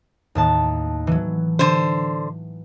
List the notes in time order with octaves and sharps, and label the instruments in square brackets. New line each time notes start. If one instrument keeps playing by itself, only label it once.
[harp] D#2 A2 A5
E3 F#3
[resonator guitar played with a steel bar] D3 C5